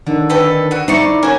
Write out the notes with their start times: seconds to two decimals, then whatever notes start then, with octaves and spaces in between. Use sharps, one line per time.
0.06 D3 D#3
0.30 C4 A4 B4
0.71 F#4 D#6
0.88 D#4 E4 C5 D5 C#6
1.23 C#4 F#4 A#4 G#6